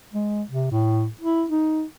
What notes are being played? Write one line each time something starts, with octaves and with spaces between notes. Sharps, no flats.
G#3
C3
A2
E4
D#4